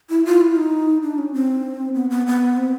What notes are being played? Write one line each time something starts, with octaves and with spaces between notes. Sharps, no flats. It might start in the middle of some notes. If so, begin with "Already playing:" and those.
E4
F4
E4
D#4
D4
C#4
C4
B3
B3
B3
C4